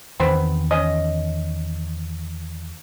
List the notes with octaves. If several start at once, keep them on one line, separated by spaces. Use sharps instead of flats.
E2 D#3 B3 C4
C#4 D#5